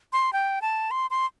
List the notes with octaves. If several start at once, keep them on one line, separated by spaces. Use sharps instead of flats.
C6
G5
A5
C6
C6